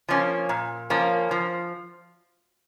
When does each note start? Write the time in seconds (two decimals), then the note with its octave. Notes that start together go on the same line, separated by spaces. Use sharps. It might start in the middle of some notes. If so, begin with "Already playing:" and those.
0.09 F3 A#3 C#4
0.49 A#2
0.90 F3 A#3 C#4
1.31 F3